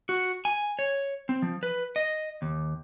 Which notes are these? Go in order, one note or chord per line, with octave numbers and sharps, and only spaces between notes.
F#4
G#5
C#5
C4
F3
B4
D#5
D#2